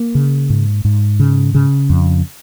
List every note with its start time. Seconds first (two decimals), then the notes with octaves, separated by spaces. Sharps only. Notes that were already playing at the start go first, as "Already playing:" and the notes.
Already playing: A#3
0.15 C#3
0.50 G#2
0.85 G#2
1.20 C#3
1.55 C#3
1.90 F2